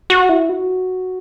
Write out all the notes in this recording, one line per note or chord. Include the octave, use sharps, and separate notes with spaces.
F#4
E4
F#4